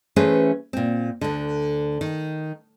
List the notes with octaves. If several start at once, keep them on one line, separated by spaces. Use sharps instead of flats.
E3 A3 C#4 G#4 B4 C5
A#2 C4
D2 D3
D#3